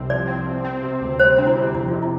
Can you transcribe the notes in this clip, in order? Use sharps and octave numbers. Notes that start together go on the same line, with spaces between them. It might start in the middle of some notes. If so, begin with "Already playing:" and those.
Already playing: C2 C3 C4
F3 D5
C4
C3
C4
C3
D2
G3 C5
C4 D4
E4
C3
F2 E4
F4
C3
E4